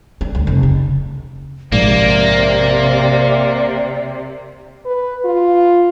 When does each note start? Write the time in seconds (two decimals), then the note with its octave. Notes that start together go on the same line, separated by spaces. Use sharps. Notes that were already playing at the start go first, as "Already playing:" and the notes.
0.21 D4
0.35 D2
0.47 F1
0.63 C#3
1.72 A#1 G#2 C3 A#3 D5
4.86 B4
5.25 F4